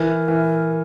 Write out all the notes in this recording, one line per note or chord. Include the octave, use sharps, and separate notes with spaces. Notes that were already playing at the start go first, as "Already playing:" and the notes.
Already playing: E3 A#4
E3